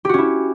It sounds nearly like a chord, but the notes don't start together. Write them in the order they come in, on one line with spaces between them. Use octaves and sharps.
G4 F#4 C#4 E4